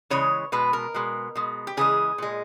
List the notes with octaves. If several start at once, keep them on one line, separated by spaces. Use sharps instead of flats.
C#3 E3 G#3 C#5
B2 G#3 B4
A#4
B2 G#3
B2 G#3
G4
C#3 E3 G#3 G#4
A#2 G#3